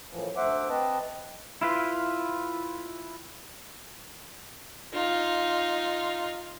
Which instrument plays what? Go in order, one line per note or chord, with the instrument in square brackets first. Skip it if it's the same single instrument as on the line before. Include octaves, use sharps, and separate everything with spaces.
[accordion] F#2 A2 E3 F3
D2 A3 C5 E5 F#5 D6
C4 B4 D#5 A5
[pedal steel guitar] E4 F4 B4
[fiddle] D#4 F4